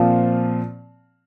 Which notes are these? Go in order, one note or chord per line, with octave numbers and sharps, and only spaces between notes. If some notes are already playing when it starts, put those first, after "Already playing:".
Already playing: A#2 F3 C4 F4